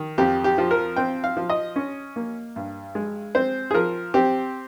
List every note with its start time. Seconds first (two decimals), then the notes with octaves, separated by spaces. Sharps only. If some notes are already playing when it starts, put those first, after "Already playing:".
Already playing: D#3
0.18 F2 G4
0.44 G4
0.58 F3
0.71 A#4
0.96 C4 G5
1.24 F5
1.37 F3
1.50 D#5
1.76 C#4
2.16 A#3
2.56 G2
2.95 G#3
3.35 C4 C5
3.71 G#4
3.74 F3 A#4
4.14 C4 G4